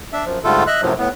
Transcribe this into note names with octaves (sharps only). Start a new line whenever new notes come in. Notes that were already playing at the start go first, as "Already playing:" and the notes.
D4 E5
F#2 F3
G#2 D3 G3 A3 F4 A4
D#5 E5 F#6
F#2 A2 C3 F3 F#3
A2 B3